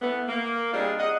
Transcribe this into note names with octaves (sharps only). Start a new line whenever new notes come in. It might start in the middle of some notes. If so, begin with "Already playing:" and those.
E3 A3 B3
A#3
G3 C4 D4 D#4 F4 G#4
D#5 F#5